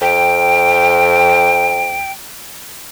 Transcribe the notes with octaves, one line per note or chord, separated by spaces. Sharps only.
F2 G5